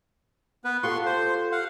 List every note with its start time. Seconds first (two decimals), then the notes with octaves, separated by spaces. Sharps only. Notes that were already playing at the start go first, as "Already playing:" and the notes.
0.64 B3 B4
0.83 F4 G4 A4 C6 C#6
1.06 C5
1.52 F5 F#5